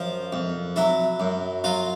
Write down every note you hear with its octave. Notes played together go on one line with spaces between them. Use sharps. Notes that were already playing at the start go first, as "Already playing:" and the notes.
Already playing: F#2 F3
F2
F#3 E4
F#2
F#3 F4